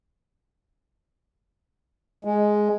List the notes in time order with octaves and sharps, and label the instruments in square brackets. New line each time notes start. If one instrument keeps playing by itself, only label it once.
[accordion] G#3